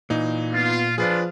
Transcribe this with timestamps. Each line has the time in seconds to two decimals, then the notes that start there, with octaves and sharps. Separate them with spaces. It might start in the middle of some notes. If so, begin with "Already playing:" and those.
0.10 A#2 E3 D#4
0.53 B3 F4
0.98 F3 D4 F4 G#4 B4 D5